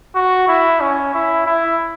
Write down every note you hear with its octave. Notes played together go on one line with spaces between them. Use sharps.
F#4
E4
C#4
E4
E4